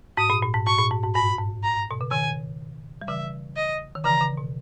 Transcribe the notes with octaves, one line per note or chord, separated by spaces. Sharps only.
G#2 D#6
A#2
A#2
G#2
G#2 C#6
A#2
G#2
G#2
G2 B5
G#2
A#5
B2
C#3
B2 D#3 G#5
G3
C#3 E3 E5
D#5
D#3
C#3 E3 A#5
C#3
B2